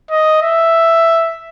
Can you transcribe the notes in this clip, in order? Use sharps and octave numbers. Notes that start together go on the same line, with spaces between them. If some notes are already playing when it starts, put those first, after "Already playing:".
D#5
E5